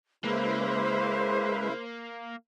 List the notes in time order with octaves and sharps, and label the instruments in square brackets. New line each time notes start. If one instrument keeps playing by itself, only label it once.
[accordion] C#3 E4 [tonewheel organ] G#3 B4 [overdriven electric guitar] A#3 [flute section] C5